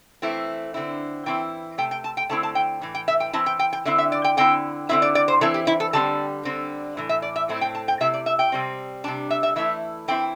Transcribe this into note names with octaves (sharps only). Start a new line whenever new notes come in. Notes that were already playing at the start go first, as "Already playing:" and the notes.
E3 A3 C4 E4
D3 C4 E4
E3 C4 E4 G5
C3 A3 G5
G5
A5
G5
D3 A3 C4 E4 A5
A5
G5
A2 E3
G5
E5
G5
E3 C4 E4 A5
G5
G5
G5
D3 C4 E4 E5
E5
D5
G5
D3 C4 E4 G5
D3 C4 E4 E5
D5
D5
C5
E3 C4 E4 A4
G4
E4
A4
D3 G3 C4 A5
D3 G3 C4
A2 E3
E5
D5
E5
A2 A3 C4 E4
G5
A5
G5
C3 A3 E4 E5
D5
E5
G5
C3 G3 C4
C3 G3 D4 A5
E5
E5
E3 A3 E4 E5
E3 C4 E4 G5